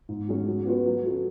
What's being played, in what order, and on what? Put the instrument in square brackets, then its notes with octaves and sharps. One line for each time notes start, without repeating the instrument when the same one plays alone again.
[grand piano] G#2
F#3 C#4 G#4
F#3
B3 F#4 B4
F#3
C#4 F#4 A4